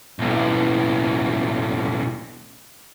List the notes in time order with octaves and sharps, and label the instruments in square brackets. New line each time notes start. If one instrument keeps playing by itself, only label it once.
[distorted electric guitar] B1 A2